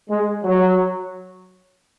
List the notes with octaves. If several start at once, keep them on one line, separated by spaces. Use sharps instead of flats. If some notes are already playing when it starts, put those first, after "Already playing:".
G#3
F#3